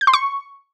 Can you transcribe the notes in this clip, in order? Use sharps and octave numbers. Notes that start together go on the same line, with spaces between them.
G6
C6
C#6